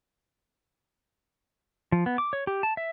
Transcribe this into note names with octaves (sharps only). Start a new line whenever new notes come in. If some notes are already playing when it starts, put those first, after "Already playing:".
F3
B3
D6
C#5
G4
A5
E5